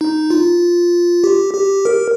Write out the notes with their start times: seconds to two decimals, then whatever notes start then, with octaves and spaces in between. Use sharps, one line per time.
0.01 D#4
0.30 F4
1.24 G4
1.54 G4
1.85 A#4